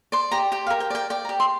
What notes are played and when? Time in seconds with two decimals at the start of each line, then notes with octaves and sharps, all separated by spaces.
0.12 D5 C6
0.31 G4 A#5
0.52 G4 G5
0.67 F5
0.70 A#4
0.80 G5
0.90 D5 G5
1.10 D5 G5
1.25 A#5
1.29 G4
1.40 C6